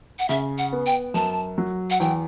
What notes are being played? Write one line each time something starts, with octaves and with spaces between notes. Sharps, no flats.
F#5
C#3 E5
F#5
B3
G5
F#2 A5
F#3
F#5
E2 G5